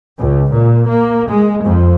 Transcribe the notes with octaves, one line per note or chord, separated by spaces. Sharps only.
C#2
A#2
A#3
G#3
F2